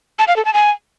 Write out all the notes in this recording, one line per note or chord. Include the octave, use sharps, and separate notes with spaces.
A5
F5
A4
A5
G#5